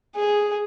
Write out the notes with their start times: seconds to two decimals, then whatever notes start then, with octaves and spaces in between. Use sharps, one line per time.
0.15 G#4